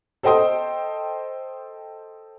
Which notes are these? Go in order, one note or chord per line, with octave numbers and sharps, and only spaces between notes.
A4 C5 D#5 G5 C6 D#6